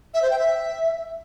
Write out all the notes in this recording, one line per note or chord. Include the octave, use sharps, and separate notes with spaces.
E5
C5
G5
E5